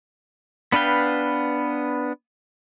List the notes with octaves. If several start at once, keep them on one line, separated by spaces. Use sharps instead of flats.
B3 D4 B4 F5 G5